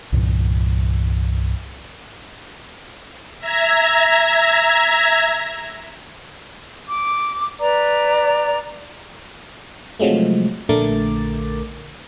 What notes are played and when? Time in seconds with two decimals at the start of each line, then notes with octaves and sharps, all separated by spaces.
0.12 C2 G2 A#2 E3
3.40 E5 A#5 G#6
6.88 D6
7.59 B4 D5 A#5
10.00 C3 F3 F#3 G#3 A3
10.69 A#1 D3 A3 A#4 D6 A6